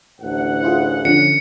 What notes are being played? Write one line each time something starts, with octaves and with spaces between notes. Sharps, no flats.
A1 D2 F#5
E4 F4 G#4
D3 F3 C#4 C#7